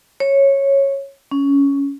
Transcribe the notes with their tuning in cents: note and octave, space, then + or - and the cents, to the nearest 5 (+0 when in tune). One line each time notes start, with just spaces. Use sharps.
C#5 -10
C#4 +10